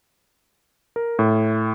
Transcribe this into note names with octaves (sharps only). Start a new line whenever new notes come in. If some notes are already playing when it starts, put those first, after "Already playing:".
A#4
A2